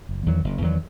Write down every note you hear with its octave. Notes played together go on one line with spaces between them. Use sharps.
F#1
E2 D#3 F#3
F#1
E2 D#3 F#3